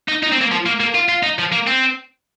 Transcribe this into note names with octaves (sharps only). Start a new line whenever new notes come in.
D#4
D#4
C4
A#3
F3
A#3
A#3
F4
F4
D#4
F3
A#3
C4